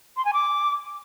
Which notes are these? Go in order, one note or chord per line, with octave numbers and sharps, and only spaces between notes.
C6
G#5
D6